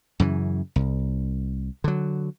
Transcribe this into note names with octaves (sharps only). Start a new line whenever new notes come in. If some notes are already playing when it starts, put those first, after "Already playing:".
F#2 C#3 E3
C2
D3 F#3